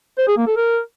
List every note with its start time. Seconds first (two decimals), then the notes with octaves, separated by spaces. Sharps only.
0.18 C5
0.28 G#4
0.37 A#3
0.47 A4
0.57 A#4